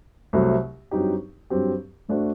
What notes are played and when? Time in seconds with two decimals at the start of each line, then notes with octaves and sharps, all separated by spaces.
0.33 C2 C3 F#3 A3 C4
0.91 G2 F#3 C4 D#4 G4
1.50 G2 F#3 C4 G4
2.08 A2 A3 D4 F#4 C5